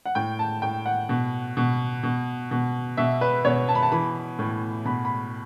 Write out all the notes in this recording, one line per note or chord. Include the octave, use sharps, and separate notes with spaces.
F#5
A2 G5
A5
A2 G5
F#5
B2
B2
B2
B2
B2 E5
B4
B2 C#5
A5
B5
A5
E3 B5
A2
B2 B5
B5